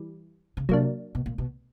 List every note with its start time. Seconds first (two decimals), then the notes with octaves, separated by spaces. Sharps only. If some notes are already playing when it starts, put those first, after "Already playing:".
Already playing: E3 G3
0.57 C#3
0.69 C3 F#3 A#3 D4
1.15 B2
1.26 A#2
1.38 B2